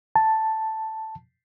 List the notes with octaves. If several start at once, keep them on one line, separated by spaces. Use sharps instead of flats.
A5